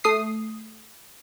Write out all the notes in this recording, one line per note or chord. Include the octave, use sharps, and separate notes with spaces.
A3 D#6 C7